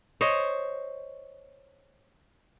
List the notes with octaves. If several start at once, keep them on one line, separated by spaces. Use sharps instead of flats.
C5 C#5 D#5